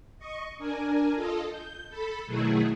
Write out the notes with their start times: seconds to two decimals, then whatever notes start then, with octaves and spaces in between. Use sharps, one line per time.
0.18 D#5 C#6
0.58 D4 A#4 G#5
1.15 F4 A4 D#5
1.50 G6
1.89 A4 B5
2.27 B2 D#3 F#3 A3 E4 G#4